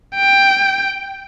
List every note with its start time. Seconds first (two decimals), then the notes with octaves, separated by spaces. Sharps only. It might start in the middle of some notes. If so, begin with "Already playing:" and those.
0.15 G5